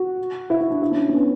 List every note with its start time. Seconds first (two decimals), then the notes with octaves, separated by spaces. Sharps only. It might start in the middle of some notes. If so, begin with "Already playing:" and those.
Already playing: F#4
0.50 E4
0.61 E4
0.71 D4
0.82 E4
0.91 C#4
0.97 D4
1.09 C#4
1.13 B3